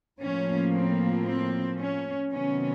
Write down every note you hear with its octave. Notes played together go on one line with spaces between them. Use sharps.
A2 F3 A#3 C#4
C4
C4
C#4
C3 D#3 F#3 B3 C#4